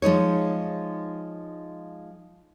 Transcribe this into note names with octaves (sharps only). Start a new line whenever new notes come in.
F3 G#3 D#4 C#5